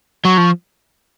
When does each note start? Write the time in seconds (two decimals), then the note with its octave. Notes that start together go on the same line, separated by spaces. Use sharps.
0.25 F#3 C#6
0.38 F3